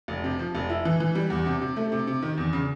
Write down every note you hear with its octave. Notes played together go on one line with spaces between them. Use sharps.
F1
C3
F3
F1
E4
E3
E3
G3
E2
C3
C3
A3
C3
C3
D#3
E2
C#3